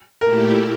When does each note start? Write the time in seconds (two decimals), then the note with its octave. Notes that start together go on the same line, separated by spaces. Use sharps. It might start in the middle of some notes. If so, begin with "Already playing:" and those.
0.21 A#2 A3 E4 G4 A#4